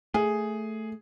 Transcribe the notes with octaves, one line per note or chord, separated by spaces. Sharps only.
A3 G#4